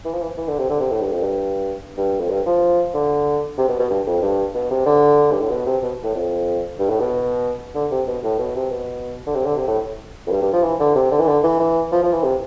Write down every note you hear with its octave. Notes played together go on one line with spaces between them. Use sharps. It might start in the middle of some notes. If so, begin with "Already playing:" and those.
E3
F3
E3
E3
D3
C3
D3
C3
A2
G2
F2
G2
G2
F2
G2
F3
D3
C3
B2
B2
G2
F2
G2
B2
C3
D3
G2
A2
B2
C3
B2
A2
F2
G2
A2
B2
D3
C3
B2
A2
B2
C3
B2
D3
C3
D3
C3
A2
F2
G2
G2
F3
E3
D3
C3
D3
E3
D3
E3
E3
F3
F3
E3
C3